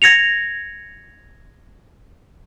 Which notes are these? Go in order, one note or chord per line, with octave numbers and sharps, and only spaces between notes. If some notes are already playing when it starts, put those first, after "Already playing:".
G#6 A#6 C#7 F7